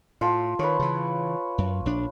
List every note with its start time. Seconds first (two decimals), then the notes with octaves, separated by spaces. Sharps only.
0.21 A2 F4 A5
0.59 D#3 B4 C#5
0.79 C#3 E3
1.58 F#2
1.85 A#1 D4